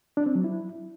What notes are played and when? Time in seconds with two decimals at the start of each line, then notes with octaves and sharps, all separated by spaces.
0.17 D4
0.26 C4
0.35 F#3
0.44 E4